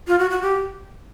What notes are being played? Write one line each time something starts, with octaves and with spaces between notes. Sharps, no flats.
F4
F#4
F#4
G4